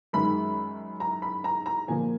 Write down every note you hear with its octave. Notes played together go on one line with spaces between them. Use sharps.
F#2 D#3 G#3 B5
A#5
B5
A#5
A#5
A#2 F3 A#3 G#5